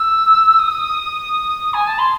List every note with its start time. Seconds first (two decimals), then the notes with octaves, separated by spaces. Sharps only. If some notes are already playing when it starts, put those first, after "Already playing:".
Already playing: E6
0.59 D#6
1.73 G#5
1.86 A5
1.98 C6